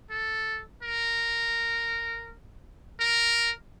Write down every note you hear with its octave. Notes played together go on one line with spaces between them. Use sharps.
A4
A#4
A#4